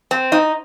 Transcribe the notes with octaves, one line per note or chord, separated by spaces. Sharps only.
C4
D#4